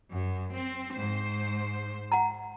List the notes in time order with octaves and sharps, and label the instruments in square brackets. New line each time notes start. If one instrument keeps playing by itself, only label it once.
[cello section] F#2
C4
G#2 C5
[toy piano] F#5 A#5